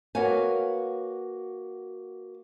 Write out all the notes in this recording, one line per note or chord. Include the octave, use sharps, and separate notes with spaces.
A#3 F#4 B4 C#5 F5 G#5